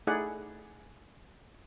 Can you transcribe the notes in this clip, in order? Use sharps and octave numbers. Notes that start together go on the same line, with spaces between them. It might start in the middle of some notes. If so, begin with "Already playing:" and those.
A3 D#4 E4 G#4 D5 F#5